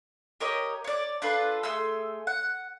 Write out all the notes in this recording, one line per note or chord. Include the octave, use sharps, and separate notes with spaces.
G4 A#4 C#5 D#5
C#5 D5
D4 F4 A4 B4
A3 G#4 C6 E6
F#5